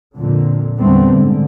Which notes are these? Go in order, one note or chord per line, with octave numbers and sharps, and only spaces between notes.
F2 A#2 D3
E2 D3 G3 A3 B3 C4
G#2 D3